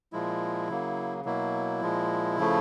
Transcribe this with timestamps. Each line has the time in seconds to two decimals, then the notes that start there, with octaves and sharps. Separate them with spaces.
0.13 A#2 F3 G#3 E4
0.69 C#3 F#3 A#3
1.25 B2 F#3 A#3 E4
1.81 A#2 F3 G#3
2.38 C#3 F3 A3